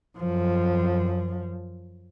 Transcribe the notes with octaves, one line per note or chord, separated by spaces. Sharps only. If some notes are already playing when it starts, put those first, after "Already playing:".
F#2 F3